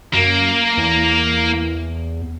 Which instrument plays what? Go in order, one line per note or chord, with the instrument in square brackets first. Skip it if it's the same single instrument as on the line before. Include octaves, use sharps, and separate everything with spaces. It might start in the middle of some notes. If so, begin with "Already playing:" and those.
[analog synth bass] F#2 [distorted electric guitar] A#3
[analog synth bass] E2